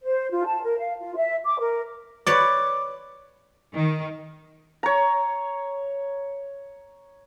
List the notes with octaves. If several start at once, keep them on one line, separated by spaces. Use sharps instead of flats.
C5
F4
A5
A#4
F5
F4
E5
D6
A#4
B4 C#5 D5 D6
D#3
C#5 A#5